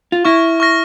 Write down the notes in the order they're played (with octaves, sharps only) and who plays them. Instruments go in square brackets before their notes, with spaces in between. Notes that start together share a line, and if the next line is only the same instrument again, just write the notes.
[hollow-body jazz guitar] F4
[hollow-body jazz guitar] E4 [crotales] C#6 F6 A#6
[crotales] C#6 F6 A#6